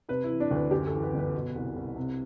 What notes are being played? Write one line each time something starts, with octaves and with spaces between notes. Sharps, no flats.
C3 B4
E4
E3
D4
D2
B4
F#2 G4
A4
E3
B4
G1
B4
B2
C2
C2
C3